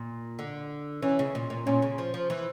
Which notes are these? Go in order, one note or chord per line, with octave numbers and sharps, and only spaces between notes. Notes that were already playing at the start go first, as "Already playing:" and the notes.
Already playing: A#2
D3
E3 C#4
C#3
A#2
A#2
A#2 C#4
C#3
F3
F3
E3